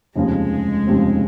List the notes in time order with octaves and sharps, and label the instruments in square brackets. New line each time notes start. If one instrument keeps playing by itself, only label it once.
[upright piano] F1 D#2 C#3 F3 C4 [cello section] G#3
[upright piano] F1 D#2 C#3 F3 C4